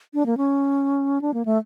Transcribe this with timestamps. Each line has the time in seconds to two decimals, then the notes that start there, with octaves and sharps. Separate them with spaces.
0.14 D4
0.26 A#3
0.37 C#4
1.21 D4
1.34 A#3
1.45 A3